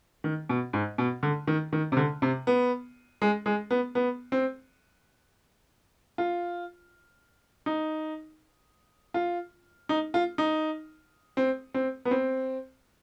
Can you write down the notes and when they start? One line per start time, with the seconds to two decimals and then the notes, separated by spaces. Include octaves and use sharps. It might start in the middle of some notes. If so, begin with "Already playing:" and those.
0.24 D#3
0.49 B2
0.73 G#2
0.98 B2
1.23 D3
1.47 D#3
1.73 D#3
1.92 C3
1.97 D3
2.22 C3
2.47 B3
3.22 G#3
3.46 G#3
3.71 B3
3.95 B3
4.32 C4
6.18 F4
7.66 D#4
9.14 F4
9.89 D#4
10.14 F4
10.38 D#4
11.37 C4
11.74 C4
12.05 B3
12.11 C4